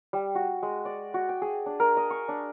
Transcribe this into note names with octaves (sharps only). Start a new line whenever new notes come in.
G3
F#4
G#3
D5
F#4
G5
G#4
D4
A#4
D#5
C#6
D4